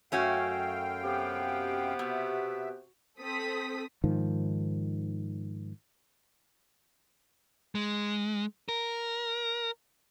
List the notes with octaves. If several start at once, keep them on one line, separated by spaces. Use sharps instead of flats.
F#2 A3 C#4 F#4 F5 G5
C3 B3 G4
B2 E5
C4 A4 D#6 B6
G#2 D#3 F3
G#3
A#4